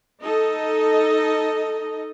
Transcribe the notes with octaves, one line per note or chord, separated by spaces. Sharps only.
D#4 A4 D#5